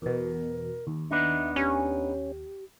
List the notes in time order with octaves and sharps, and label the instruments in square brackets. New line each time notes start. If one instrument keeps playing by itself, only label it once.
[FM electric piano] E2 B2 [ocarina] A#4
[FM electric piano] D#2
[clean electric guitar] B3 D4 D#4 [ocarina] E5
[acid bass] C#4 [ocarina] G4